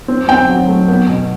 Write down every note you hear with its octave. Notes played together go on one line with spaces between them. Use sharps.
C4
C4 G5
F#3
A3
B3
B2